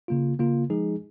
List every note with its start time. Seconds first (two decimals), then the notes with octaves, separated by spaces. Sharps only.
0.08 C#3 A#3 F4
0.39 C#3 A#3 F4
0.70 F3 G#3 D#4 G#4